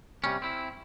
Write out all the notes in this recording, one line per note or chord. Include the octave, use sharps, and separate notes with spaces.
C3 G3 C#4
C4 E4